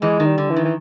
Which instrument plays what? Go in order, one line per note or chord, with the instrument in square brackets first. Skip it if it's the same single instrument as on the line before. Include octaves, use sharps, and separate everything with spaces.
[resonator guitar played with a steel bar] E2 E3 [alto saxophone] G#3
[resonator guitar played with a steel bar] D#3
[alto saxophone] G3
[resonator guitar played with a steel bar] D3
[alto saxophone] E3
[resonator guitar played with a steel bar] D#3
[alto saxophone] E3